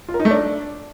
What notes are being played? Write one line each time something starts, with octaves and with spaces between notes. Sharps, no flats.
F4
A#4
D#4
A3
D4